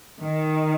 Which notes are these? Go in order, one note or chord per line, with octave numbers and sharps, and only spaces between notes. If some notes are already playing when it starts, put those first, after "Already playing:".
D#3